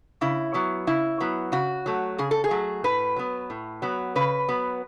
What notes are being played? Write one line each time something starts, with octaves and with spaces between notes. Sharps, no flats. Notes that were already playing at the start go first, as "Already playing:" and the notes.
C#3 E4
F#3 B3
C#3 E4
F#3 B3
C#3 F#4
F#3 A3
C#3 G#4
A4
G#4
F#3 A3
A2 B4
F#3 B3
A2
F#3 B3
C#3 B4
F#3 B3